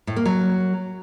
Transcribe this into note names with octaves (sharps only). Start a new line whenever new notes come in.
A2
A#3
F#3